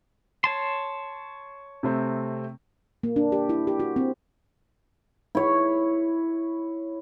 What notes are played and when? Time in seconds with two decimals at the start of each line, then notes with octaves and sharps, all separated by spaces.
0.44 C#5 A5 C6
1.83 C3 A3 C4
3.03 A#3
3.16 D4
3.32 G4
3.49 E4
3.67 G4
3.80 F#4
3.96 C4
5.35 E4 C#5